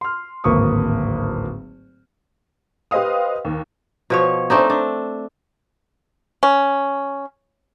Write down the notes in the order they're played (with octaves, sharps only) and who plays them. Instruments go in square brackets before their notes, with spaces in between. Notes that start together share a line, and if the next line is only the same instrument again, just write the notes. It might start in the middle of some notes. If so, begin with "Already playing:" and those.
[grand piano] C6 F6
D1 G#1 A#3 B4 C#6 D#6
[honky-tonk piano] G4 B4 C5 D#5 F5 D#6
D#2
[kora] B2 F3 C#5
A3 C4 D4 D#4
D4
[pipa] C#4